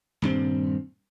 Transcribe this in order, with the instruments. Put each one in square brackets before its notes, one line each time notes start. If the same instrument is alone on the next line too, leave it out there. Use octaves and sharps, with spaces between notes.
[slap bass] D#1 G2 C4